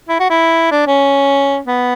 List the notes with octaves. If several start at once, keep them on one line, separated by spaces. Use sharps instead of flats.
E4
F#4
E4
D4
C#4
B3